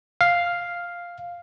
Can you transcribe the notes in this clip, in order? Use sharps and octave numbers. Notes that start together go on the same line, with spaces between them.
F5